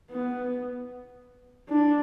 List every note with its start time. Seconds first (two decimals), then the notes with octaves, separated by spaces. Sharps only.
0.11 B3
1.69 D4